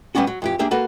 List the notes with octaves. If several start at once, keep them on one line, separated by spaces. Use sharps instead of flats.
F#3 G3 B3 C#4 D4 F#4
F#3
F2 E3 G4
A#3 D4 G4 G#4 E5
A#3 F#4 A4 B4